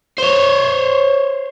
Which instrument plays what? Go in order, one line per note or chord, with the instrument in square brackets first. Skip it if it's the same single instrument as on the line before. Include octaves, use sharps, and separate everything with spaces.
[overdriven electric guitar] C5 C#5